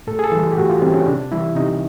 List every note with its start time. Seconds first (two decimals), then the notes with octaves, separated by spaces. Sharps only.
0.07 A2 A4
0.19 G#4
0.24 A4
0.32 E3 G3
0.52 G4
0.57 A2 F#4
0.69 F4
0.82 E3 G3 C4
0.94 C#4
1.06 C3 D4
1.32 E3 G3 E4
1.55 C3 D#4